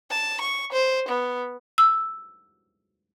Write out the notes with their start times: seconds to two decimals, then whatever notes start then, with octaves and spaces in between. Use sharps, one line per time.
0.11 A5
0.41 C#6
0.72 C5
1.09 B3
1.78 E6